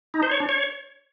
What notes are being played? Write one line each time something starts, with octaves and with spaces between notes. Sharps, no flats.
D#4
C5
C#5
D4
C#5